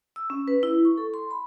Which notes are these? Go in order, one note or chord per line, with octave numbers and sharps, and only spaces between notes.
E6
C#4
B4
E4
C#6
A4
C6
B5